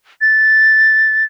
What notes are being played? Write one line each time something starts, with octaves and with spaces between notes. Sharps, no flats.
A6